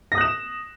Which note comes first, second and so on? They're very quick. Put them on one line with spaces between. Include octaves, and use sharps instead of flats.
A#6 D#6 F#6 E7